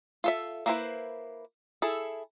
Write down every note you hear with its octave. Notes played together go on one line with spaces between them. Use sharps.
F4 A4 E5
A#3 D4 E4 B4 C5
E4 G#4 A4